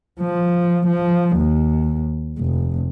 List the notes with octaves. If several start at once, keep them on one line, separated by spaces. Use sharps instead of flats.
F3
F3
D#2
F1